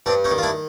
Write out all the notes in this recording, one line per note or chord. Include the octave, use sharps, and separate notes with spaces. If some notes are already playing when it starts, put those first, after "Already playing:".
G2 C4 D4
C#4 D#4
D#3
F4
D4 E4